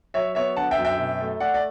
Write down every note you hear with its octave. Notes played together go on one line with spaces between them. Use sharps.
F#3 C#5 E5
B3 C#5 E5
D3 F#5 A5
E5 G5
F#2
E5 G5
B2
A3
A3 D5 F#5
D5